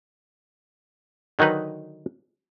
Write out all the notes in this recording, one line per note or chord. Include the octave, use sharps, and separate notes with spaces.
D3 D#3 F#3 D#4 B4